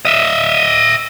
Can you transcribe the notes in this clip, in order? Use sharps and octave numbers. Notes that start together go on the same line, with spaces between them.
D#5 E5